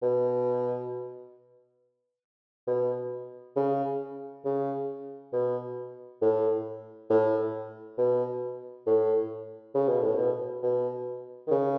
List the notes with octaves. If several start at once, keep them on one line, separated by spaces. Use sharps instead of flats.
B2
B2
C#3
C#3
B2
A2
A2
B2
A2
C#3
B2
A2
B2
B2
D#3
C#3